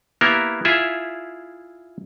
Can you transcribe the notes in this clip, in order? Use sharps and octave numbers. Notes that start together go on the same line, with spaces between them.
A#3 B3 E4 G4 A#4
E4 F4 G#4 E5